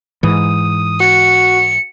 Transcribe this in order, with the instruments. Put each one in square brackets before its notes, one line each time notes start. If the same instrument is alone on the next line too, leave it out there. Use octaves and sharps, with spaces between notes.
[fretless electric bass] G#2 E3 [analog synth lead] D#6
[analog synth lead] F#4 [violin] C#7